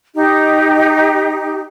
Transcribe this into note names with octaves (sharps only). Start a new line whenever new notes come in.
D#4 G4